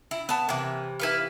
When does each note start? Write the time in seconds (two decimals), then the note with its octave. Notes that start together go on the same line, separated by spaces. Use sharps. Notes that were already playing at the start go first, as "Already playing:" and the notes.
0.11 E4
0.29 B3 A5
0.49 C3 E3 A#3
1.00 E4 B4 F5